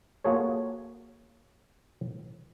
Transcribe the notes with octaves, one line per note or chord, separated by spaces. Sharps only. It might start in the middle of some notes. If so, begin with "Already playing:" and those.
A#3 F4 F#4 G#4 A4 C#5